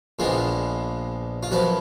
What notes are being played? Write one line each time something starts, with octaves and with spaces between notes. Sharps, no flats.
A#1 A#2 F3 G#3 B3 F4
F4
F#2 F3 B3 F#4